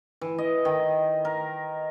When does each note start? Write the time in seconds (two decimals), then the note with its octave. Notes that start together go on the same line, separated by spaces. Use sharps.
0.21 E3
0.38 D#5
0.65 D#3
1.25 A#4